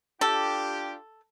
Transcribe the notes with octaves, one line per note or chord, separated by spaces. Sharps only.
D4 F4 G4 A4